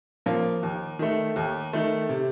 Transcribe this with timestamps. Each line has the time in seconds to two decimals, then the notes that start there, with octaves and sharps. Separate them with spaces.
0.26 F3 A#3
0.63 D#2
0.99 D#3 A3
1.36 D#2
1.73 D#3 A3
2.09 C3